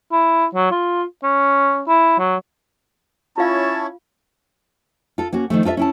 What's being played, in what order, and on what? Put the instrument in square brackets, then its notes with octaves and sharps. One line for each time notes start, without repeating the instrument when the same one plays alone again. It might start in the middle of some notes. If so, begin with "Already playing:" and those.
[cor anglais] E4
F#3
F4
C#4
E4
F#3
[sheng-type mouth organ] C#4 E4 C#5 [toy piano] F4 F5 [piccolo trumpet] A5
[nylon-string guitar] F4 A4
A#3 C#4 F#4
D#3 F3 A3
F4 A4 C5 E5
C#4 E4 A5